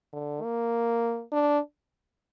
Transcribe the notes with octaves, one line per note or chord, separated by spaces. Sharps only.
D3
A#3
D4